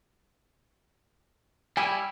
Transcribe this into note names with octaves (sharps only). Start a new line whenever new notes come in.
G3 E4 G4 G#5